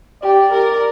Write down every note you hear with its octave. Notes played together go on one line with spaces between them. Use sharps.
G4 D5
A#4